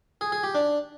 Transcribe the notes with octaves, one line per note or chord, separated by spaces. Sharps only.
G#4
G#4
G4
D4